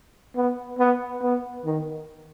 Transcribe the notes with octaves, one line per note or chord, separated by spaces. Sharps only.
B3
B3
B3
D#3